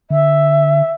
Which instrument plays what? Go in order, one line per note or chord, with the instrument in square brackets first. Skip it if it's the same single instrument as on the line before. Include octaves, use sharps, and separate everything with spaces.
[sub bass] D3 [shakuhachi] E5